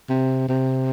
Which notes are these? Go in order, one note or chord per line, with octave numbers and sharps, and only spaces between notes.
C3
C3